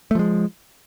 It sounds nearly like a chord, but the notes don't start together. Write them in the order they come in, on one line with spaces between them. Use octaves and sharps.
A3 F3 G#3